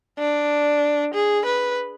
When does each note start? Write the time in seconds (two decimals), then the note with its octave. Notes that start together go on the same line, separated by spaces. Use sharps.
0.19 D4
1.14 G#4
1.45 B4